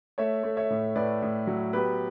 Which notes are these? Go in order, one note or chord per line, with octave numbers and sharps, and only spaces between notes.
A3 C#5 E5
A3
C#5 E5
A2
A2 B4 D5
A2
F#3
B3 G4 B4